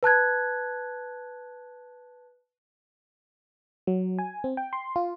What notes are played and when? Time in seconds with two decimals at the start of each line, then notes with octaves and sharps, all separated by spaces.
0.03 B4 A5 F#6 G#6
3.87 F#3
4.19 G#5
4.44 C4
4.57 G5
4.73 C6
4.96 F4